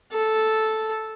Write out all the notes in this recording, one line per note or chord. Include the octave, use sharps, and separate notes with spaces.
A4